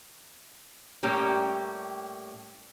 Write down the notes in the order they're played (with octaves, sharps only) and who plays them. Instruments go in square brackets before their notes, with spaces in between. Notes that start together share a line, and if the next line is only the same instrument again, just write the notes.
[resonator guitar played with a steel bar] A2 G3 A#3 C#4 G4